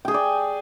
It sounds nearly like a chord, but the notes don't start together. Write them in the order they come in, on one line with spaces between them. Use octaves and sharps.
G5 G#4 G#5 D5